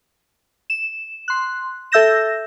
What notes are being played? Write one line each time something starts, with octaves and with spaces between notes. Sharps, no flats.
E7
C6 F#6
A4 E5 E6 G6 A#6 E7